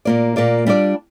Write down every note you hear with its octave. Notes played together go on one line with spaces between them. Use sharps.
A#2 A#3 F4 D5
A#2 A#3 F4 D5
G3 D4 F4 D5